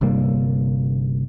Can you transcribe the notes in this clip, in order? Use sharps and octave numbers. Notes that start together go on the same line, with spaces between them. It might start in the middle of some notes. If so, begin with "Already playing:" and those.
G1 C3 G3 A#3